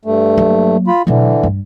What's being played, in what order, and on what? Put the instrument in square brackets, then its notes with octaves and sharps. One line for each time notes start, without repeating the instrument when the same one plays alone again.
[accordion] G2 A3
[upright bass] F#3 A#3
[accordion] F4 B5
[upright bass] B2 F#3 [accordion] D3 E3
[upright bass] G2